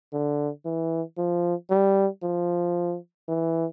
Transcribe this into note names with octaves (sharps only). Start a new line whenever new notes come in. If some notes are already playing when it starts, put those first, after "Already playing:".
D3
E3
F3
G3
F3
E3